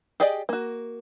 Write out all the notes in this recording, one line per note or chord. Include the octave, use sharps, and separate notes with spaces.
G4 G#4 D5 D#5 G5
A#3 F#4